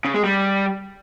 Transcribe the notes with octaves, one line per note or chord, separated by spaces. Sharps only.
C#3
G#3
G3